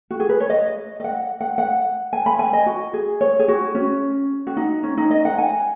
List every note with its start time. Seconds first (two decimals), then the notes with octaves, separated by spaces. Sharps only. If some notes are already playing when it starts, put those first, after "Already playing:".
0.11 F#4
0.20 G#4
0.29 B4
0.40 C#5
0.50 D#5
1.00 D#5
1.04 F#5
1.41 F#5
1.58 F#5
2.13 G#5
2.26 B5
2.39 G#5
2.53 D#5
2.66 F#4
2.93 G#4
3.21 C#5
3.39 G#4
3.48 F#4
3.75 C#4
4.47 F#4
4.57 D#4
4.83 C#4
4.97 D#4
5.10 D#5
5.25 F#5
5.38 G#5